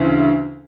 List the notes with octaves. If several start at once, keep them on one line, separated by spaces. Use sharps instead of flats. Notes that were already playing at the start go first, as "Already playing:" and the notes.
Already playing: D2 C#3 E3